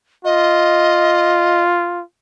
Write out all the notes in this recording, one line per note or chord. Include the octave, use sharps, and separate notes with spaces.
F4 D#5